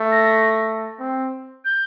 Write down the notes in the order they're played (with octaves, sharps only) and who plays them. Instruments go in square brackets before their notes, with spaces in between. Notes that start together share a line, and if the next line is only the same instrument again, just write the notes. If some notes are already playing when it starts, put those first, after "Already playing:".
Already playing: [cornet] A3
[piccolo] A#6
[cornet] C4
[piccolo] G6